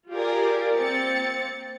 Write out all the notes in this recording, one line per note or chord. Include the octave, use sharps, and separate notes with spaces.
F4 G4 G#4 A#4 D5
A#3 C4 A6 C#7